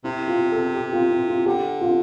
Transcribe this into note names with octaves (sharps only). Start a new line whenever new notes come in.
C3 E4
F4
A4
G4
F4
E4
F4
D3 G4
F4